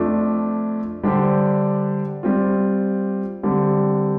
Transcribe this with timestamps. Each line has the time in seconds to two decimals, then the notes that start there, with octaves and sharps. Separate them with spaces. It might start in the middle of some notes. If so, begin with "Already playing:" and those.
Already playing: F2 F3 A3 D4
1.03 D3 G3 D4 G4 C5
2.23 G3 C4 F4
3.43 D3 G3 C4 G4